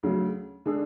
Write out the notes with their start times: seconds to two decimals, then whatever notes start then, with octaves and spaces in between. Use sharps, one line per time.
0.03 D2 C#3 F#3
0.66 D3 G#3 D4 G#4